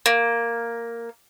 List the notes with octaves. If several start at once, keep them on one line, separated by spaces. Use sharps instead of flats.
A#3